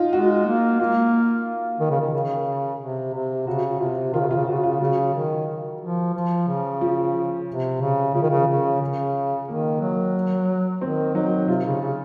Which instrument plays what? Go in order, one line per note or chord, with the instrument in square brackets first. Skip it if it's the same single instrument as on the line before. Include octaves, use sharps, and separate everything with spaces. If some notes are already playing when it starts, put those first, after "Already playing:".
Already playing: [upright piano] D#4 F4
[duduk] G#3 [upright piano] F#4
[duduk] A#3
[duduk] A#3 [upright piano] F4
[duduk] D#3
C#3
D#3
C#3
C3
C3
[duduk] C#3 [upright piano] F#4
[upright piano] F#4
[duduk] C3 [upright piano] F4
[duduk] D#3 [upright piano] F4
[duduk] C#3
[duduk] C3 [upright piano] F4
[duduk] C#3
[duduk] C#3 [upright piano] F#4
[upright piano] F4
[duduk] C#3 [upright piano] F#3
[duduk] D#3
F3
F3
C#3
[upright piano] F3
[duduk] C3
C#3
[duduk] C#3 [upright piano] F3
[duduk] D#3
C#3
C#3
C#3
[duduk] D#3 [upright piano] A#3
[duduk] F#3
[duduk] D#3 [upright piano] C4
[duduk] F#3 [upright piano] D#4
[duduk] C3 [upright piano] F4
[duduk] C#3
C#3